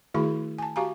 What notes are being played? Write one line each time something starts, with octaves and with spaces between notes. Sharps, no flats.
D#3 A3 E4 F#4 G#4 B5
G#5 A5
F#4 G4 F5 G#5 A#5